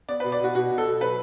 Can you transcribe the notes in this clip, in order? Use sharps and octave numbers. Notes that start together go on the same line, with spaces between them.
B3 D5
B2 B4
D5
B2 F#4
B2 F#4
B2
A4
B2
F#3 B4